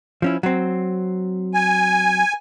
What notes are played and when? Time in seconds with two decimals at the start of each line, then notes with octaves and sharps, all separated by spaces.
0.22 F3 C#4 E4
0.43 F#3 C4
1.54 G#5